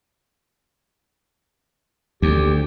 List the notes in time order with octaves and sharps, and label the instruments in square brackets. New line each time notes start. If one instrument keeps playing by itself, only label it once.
[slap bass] D2 [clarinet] G4